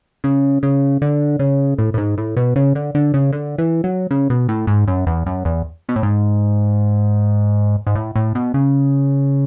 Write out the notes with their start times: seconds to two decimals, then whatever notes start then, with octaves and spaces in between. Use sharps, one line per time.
0.24 C#3
0.63 C#3
1.02 D3
1.39 C#3
1.79 A2
1.94 A2
1.98 G#2
2.18 A2
2.37 B2
2.56 C#3
2.75 D3
2.95 D3
3.14 C#3
3.33 D3
3.58 E3
3.84 F#3
4.11 C#3
4.30 B2
4.49 A2
4.67 G#2
4.87 F#2
5.06 E2
5.26 F#2
5.45 E2
5.89 B2
5.96 A2
6.03 G#2
7.87 G#2
7.95 A2
8.16 A2
8.35 B2
8.54 C#3